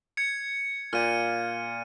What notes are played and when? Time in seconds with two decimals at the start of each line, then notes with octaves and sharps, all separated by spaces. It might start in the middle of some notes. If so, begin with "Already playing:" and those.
0.17 G#6 C#7
0.93 A#2 F6 D#7